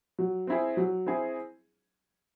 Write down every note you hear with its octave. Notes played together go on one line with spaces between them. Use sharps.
F#3
C4 E4 G#4
F#3
C4 E4 G#4